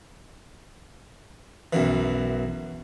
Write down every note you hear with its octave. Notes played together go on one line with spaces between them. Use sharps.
B1 F#2 E3